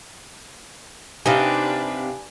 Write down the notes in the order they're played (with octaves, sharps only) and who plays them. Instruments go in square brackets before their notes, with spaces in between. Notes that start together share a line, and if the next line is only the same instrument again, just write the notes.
[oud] C3 C4 D#4 [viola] D4 B4 [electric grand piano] G4 F5 [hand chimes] G#5